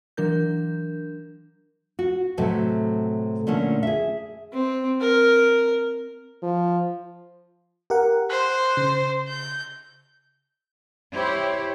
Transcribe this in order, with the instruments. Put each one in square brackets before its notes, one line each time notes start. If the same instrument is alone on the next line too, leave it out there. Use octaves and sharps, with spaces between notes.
[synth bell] E3 F#3 D4 A#4 G6
[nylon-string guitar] F#4
A2 C3 F#3
A#2 D3 A3 C#4
G#4 E5
[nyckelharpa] C4
A#4
[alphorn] F3
[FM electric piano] G4 A#4 F#5
[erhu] C5 [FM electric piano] F#6
[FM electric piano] C#3
[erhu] G6
[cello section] E4 G4 C5 C#5